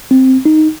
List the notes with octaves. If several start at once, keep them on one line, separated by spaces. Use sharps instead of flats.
C4
D#4